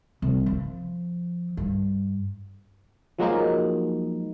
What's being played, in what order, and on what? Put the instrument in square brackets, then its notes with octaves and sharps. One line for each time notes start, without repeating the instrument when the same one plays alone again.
[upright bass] C2
F3
G2
[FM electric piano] F3 F#3 G#3 A#3 D#4